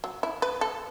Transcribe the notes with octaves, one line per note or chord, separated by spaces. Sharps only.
F#3
E4
B4
A4